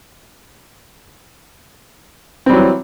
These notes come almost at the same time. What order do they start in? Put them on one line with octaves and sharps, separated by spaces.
C4 G3 F#3 E3